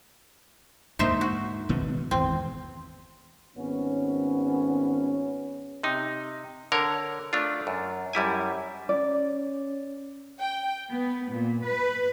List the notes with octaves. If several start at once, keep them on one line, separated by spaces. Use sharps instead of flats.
D2 G#2 A#3 D#4 C5 E5
F#4
G#1 B2 B3
G#1 E2 C4
G#1 B3 C#4
C3 D#4
D3 A#4 C#5
A3 D4 F4
F#2
F#2 G3 E4 G#5
C#4 D5
G5
B3
A#2
B4